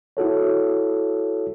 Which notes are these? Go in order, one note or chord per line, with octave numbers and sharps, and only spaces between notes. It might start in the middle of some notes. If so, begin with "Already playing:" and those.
E4 F#4 A4 C#5